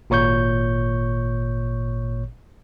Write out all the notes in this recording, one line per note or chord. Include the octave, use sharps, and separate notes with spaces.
G#1 A#2 C#5 C#6 G6